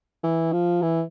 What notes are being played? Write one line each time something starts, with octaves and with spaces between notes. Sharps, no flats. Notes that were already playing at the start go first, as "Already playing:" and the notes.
E3
F3
E3